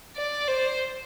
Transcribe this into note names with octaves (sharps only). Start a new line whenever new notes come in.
D5
C5